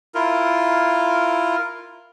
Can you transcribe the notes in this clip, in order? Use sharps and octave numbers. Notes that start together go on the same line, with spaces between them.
E4 F4 A#4